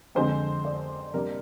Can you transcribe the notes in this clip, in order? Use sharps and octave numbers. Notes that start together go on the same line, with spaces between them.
F2 D3 G#3 C4 C5
D5
C3 G3 A#3 D4 A#4